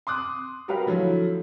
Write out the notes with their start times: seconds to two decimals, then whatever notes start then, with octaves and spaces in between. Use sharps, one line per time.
0.07 C6 D6 D#6 F#6
0.68 G3 F#4 G4 A#4 B4 F5
0.86 D3 F3 F#3 A3 E4